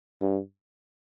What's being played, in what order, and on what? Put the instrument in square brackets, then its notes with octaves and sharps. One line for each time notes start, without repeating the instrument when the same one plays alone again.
[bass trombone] G2